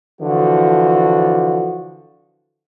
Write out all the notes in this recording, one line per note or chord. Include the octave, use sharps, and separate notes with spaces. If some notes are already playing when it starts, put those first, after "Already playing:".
D3 E3 F3 F#4